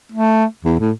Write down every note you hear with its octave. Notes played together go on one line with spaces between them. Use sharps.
A3
E2
A2